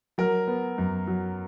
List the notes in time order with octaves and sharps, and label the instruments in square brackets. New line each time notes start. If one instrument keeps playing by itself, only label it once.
[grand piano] F#3 A#4
B3
F#2
F#3